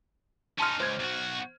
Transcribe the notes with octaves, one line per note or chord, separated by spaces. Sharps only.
C#4 D#4 A5 C6 F6
C#2 C5 G#6
B1 F#4